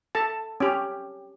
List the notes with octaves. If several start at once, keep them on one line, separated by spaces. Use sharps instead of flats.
A4 A5
C#4 G4